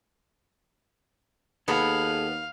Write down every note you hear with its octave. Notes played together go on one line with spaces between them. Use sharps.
D#2 B3 G#4 A4 B4 F5